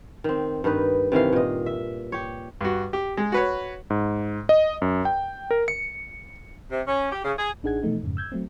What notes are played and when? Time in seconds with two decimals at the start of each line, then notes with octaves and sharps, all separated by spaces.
0.24 D#3 C4
0.64 G2 D#3 D#4 B4
1.12 C3 D#3 E3 F5
1.33 A#2 D#5
1.66 E5
2.12 G4 C#5
2.61 G2 F#4
2.93 G4
3.17 G#3
3.32 F#4 B4 C#5
3.90 G#2
4.49 D#5
4.82 F#2
5.05 G5
5.51 A#4
5.68 C#7
6.70 C3
6.86 C#4
7.12 G4
7.24 C#3
7.38 G#4
7.63 A1 D4 D#4 G#4 F#5 G#6
7.83 B2 E3 F3 A3 D#4
8.03 F2 G#2 C#3
8.17 E6 G6 G#6
8.32 F#3 A3 C4